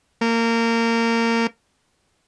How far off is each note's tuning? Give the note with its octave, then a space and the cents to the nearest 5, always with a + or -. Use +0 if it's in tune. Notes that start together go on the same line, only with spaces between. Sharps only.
A#3 -20